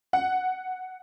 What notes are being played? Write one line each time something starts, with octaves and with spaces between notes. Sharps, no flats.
F#5